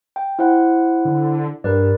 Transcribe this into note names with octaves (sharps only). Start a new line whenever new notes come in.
G5
E4 C5 F#5
D3
G2 A#4 B4 D5